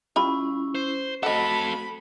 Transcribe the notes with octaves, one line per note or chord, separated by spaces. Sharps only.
G3 C#4 E4 F4 B5
C5
A3 C4 F#4 A4 D#5 F#5 B5